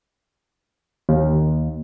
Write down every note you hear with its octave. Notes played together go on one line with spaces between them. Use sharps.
D#2